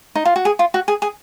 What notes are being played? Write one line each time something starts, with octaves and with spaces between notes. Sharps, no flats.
D#4
F4
F#4
G#4
F4
F#4
G#4
G#4